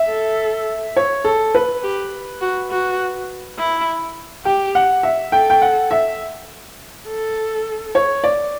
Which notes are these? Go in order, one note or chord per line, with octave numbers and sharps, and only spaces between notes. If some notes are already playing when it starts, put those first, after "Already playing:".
Already playing: E5
A4
C#5
A4
B4
G4
F#4
F#4
E4
G4 G5
F#5
E5
A4 G5
G5
F#5
E5
A4
C#5
D5